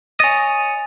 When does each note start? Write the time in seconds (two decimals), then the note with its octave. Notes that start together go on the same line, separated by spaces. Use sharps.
0.20 C#5 D#5 G#5 A6